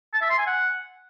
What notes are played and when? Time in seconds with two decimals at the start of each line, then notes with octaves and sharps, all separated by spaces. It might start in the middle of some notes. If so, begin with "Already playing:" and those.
0.13 A5
0.22 E5
0.30 C6
0.38 G#5
0.47 F#5